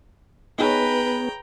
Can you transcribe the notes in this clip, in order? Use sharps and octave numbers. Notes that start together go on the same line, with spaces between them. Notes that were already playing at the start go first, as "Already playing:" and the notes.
B3 D#4 G#4 B4 C#5 G5 A#5